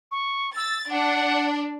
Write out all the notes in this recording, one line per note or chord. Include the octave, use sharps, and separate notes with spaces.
C#6
E6 A6
D4 F#5